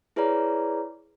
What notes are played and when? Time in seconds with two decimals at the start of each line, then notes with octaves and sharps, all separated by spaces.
0.16 E4 G#4 B4 C#5 D5 A#5